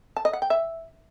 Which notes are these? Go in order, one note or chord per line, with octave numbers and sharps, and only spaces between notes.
A5
D#5
F#5
G5
E5